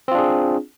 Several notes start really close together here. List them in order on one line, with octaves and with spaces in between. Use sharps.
C4 F4 D4 G#4